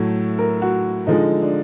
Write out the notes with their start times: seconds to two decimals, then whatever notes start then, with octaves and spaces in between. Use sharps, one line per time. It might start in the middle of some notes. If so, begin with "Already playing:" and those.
Already playing: A2 F#3 A3
0.39 A#4
0.62 F#4
1.07 D3 F3 G#3 D#4
1.42 D4